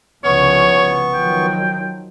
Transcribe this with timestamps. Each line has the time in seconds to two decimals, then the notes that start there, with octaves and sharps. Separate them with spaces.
0.24 C2 C#3 F3 B3 C#5 C#6
1.14 D#3 F3 F#3 G5